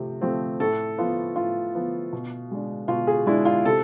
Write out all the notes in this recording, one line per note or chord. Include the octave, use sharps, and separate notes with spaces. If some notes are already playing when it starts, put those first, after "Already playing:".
Already playing: C3 F3 A3 C4
F3 A3 C4
A2 A4
F3 B3 F4
A2 F4
F3 B3
B2
G#3 D4
B2 F4
G#4
G#3 D4 E4
F4
C3 A4